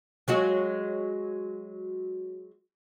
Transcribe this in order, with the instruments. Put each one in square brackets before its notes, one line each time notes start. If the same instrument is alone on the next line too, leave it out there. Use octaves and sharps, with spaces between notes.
[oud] F#3 G#3 F#4